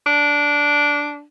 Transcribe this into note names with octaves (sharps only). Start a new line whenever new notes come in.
D4